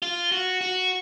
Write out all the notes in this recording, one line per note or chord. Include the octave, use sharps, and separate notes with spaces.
F4
F#4
F#4